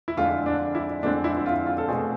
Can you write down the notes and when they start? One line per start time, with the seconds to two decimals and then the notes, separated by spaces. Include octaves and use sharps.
0.08 E4
0.17 F2 D3 G#3 C4 F4
0.46 D4
0.75 E4
1.03 F2 D3 G#3 C4 D4
1.24 E4
1.37 E4
1.46 F4
1.67 F4
1.78 A4
1.88 B2 A3 C4 G#4